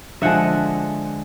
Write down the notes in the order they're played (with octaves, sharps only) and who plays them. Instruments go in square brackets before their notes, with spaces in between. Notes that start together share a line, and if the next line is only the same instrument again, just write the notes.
[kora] D3 F3 G#3 E5 F#5